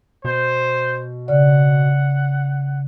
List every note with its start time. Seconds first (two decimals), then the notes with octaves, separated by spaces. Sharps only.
0.25 B2 C5
1.28 C#3 D5 F#5